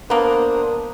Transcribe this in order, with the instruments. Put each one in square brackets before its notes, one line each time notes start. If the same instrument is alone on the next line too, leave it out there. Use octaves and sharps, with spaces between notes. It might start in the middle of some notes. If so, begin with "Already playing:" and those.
[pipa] A#3 B3 [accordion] D4 C5 D#6 [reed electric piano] A#4 A#5